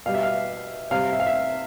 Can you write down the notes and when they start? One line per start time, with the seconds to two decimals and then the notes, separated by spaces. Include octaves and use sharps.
0.06 B2 G3 F5
0.14 E5
0.23 F5
0.91 C3 G3 F5
1.13 E5
1.20 F5
1.27 E5